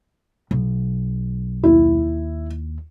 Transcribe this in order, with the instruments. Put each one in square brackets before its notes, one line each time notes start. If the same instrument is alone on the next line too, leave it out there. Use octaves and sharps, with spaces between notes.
[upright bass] B1
[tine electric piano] D#2 [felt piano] E4